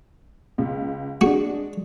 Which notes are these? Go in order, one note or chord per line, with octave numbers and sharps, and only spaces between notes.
C#2
G#3 D4 F#4